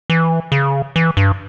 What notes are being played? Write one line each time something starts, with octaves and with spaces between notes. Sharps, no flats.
E3
C#3
E3
G2